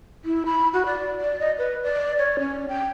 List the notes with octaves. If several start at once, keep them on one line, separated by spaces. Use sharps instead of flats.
E4
B5
F#4
D5
D5
D#5
B4
D5
C#5
C#4
G5